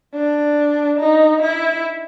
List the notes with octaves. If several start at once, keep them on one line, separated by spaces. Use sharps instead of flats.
D4
D#4
E4